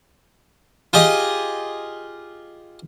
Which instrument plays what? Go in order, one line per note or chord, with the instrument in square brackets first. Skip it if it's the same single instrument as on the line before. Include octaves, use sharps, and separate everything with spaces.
[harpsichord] F4 G4 G#4 D#5